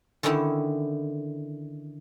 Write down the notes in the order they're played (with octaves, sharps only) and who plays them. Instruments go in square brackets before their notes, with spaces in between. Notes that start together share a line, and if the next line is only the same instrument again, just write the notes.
[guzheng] D3 D#3 C#4 D#4 E4 B5